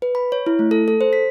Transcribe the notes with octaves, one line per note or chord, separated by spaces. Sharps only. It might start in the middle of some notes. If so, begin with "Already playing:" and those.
B4
B5
C#5
E4
A3
A4
A4
C5
B6